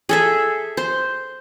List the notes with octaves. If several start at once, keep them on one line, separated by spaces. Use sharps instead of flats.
G#4 A4 E5
C5